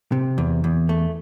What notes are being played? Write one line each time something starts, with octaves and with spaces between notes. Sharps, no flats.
C3
E2
E2
A3